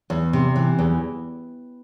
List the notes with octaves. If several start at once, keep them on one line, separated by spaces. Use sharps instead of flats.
E2
C3
E3
E2